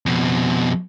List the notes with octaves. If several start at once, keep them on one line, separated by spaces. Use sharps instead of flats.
F2 B2